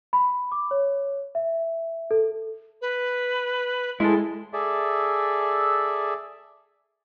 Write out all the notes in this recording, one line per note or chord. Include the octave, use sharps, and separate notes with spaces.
B5
D6
C#5
E5
A4
B4
G#3 E4 A4 C6
G#4 A4 D5 E5